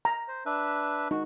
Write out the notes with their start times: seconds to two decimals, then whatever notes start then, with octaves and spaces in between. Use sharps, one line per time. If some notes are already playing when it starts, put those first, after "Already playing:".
0.05 A#5
0.28 C5
0.46 D4 B4 E5
1.11 D#4 F#4